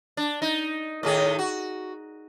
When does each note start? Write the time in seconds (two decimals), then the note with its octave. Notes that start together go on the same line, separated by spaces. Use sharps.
0.17 D4
0.42 D#4
1.03 A2 D#3 G#4
1.39 F#4